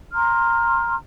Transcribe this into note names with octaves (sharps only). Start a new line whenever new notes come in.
A#5 C6 F6